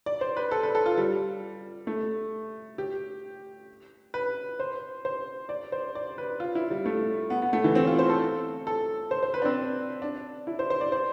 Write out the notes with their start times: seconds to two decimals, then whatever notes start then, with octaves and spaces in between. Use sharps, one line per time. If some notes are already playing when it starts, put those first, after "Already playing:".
0.06 D5
0.21 C5
0.37 B4
0.52 A4
0.63 B4
0.75 A4
0.86 F4
0.97 G3
1.87 A3
2.78 G4
4.14 B4
4.60 C5
5.05 C5
5.49 D5
5.72 C5
5.95 D5
6.18 B4
6.40 F4
6.55 E4
6.71 G3
6.86 A3
7.30 B3
7.42 B3
7.53 A3
7.64 E3
7.75 C4
7.87 F4
7.99 C5
8.10 A4
8.67 A4
9.11 C5
9.23 C5
9.34 B4
9.42 D4
9.45 C4
10.02 D4
10.47 E4
10.59 C5
10.70 C5
10.81 D5
10.92 C5